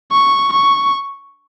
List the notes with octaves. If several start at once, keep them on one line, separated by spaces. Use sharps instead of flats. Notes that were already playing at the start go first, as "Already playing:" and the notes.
C#6
C#6